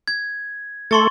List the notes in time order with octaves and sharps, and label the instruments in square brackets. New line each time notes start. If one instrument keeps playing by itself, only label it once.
[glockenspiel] G#6
[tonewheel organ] A3 A4 [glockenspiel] C6 C#6 A6